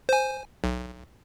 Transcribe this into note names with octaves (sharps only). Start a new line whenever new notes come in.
C5 G#5
B1